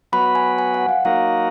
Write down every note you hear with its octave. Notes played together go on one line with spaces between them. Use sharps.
F#3 B3 F#4 B4 B5
G#5
G#5
F#5
F5
F#3 A#3 D#4 F#4 A#4 F5